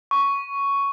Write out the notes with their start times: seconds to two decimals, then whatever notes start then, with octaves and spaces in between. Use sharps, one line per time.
0.11 C#6